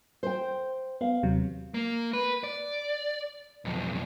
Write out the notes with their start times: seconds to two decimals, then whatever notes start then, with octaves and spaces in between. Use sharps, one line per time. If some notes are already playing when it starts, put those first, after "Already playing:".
0.23 C5 G5
1.01 B3 F5
1.23 D#2 C3 F#3
1.74 A#3
2.13 B4
2.44 D5
3.65 B1 F2